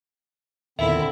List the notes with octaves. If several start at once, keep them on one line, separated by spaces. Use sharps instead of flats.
E2 A#2 D3 D#3 C4 E4 E5